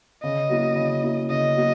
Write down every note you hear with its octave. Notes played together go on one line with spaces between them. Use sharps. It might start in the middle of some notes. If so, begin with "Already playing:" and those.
C#3 D#5
F#3 A#3 E4
C#3
F#3 A#3 E4
C#3 D#5
F#3 A#3